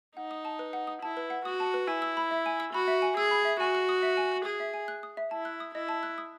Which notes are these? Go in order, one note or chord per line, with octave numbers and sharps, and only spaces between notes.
D#4 F#5
D#6
A5
B4
F#5
D#6
E4 A5
B4
F#5
F#4 D#6
A5
B4
E4 G#5
E6
B5
E5
G#5
E6
F#4 B5
E5
G#5
G#4 E6
B5
E5
F#4 G#5
F#6
D#6
E5
G#5
F#6
G#4 D#6
E5
G#5
F#6
D#6
E5
E4 A5
F#6
D#6
E4 D#5
A5
F#6
D#6